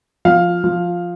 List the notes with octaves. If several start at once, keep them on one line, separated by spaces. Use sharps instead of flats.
F3 F5
F3